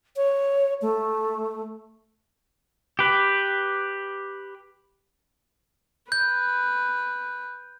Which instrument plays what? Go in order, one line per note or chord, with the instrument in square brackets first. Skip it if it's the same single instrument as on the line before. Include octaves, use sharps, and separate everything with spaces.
[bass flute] C#5
A3
[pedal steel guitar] G4 B4
[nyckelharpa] B4 [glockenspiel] G6